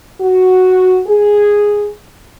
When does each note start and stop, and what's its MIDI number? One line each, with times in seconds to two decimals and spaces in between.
0.21 1.00 66
1.07 1.87 68